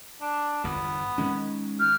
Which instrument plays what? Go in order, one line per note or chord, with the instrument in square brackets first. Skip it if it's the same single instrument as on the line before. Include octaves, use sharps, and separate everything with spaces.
[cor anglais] D4
[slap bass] G1 E2 [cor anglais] B3
[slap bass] D#3 G#3 C#4
[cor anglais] G4 [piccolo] F6